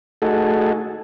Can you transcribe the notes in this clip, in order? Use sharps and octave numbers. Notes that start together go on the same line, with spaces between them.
A3 D#4 F#4 G#4 A4